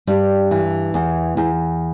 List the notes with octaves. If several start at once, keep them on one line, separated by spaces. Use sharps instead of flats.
G2 G3
E3
E2
E2